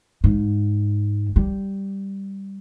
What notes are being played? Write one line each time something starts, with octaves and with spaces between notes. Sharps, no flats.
G#2
G3